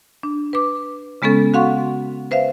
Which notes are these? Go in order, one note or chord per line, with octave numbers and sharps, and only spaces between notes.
D4
B4 D6
C#3 G#3 B3 C#4 A4
F#4 F5 F#5 C6 C#6
B4 C5 E5 F5